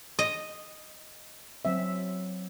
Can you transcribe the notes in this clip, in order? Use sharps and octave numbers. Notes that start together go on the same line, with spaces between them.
D#5
F#3 C4 E5